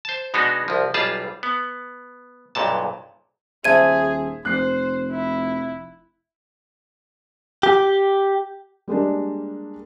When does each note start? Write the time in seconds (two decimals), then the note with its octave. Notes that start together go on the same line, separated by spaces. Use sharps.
0.05 C5 A5
0.34 B2 G#3 B3 D4 D#4 F#4
0.68 C2 F3
0.94 B1 G3 F4 G#4 A5
1.43 B3
2.55 B1 G2 A#2 A5
3.64 D#1 G#4 C5 E5 A5 G#6 D#7
4.45 F1 C5 F#6 C7
5.11 E4
7.63 G4
8.88 G3 G#3 A#3 D4